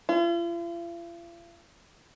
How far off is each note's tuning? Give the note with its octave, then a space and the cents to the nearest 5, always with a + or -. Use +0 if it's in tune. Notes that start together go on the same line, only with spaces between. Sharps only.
F4 -45